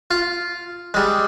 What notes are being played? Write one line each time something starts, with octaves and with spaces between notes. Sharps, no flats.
F4
G3 G#3